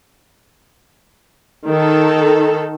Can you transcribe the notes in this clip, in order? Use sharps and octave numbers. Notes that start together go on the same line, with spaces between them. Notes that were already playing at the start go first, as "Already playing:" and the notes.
D#3 A4